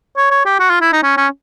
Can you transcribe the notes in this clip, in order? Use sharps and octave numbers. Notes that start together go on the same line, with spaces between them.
C#5
C#5
G4
F#4
F4
E4
D#4
C#4
C#4